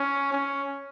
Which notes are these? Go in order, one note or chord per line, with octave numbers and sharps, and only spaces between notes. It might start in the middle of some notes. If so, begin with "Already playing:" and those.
Already playing: C#4
C#4